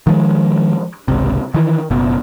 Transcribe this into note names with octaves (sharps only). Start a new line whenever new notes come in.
D#3 F3 G#3
G#1 C#2 C3
D#3 E3
F#1 B2